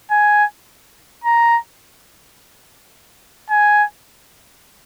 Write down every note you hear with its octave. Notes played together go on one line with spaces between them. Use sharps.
G#5
A#5
G#5